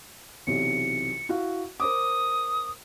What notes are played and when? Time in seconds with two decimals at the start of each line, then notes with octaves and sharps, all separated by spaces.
0.47 B1 C3 E3 C#7
1.29 E4 F#4 F5
1.80 A#4 C5 D6 D#6